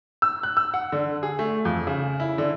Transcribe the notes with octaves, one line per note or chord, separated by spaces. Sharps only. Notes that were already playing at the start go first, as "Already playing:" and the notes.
E6
F#6
E6
F#5
D3
G#4
A3
F2
C#3
E4
D3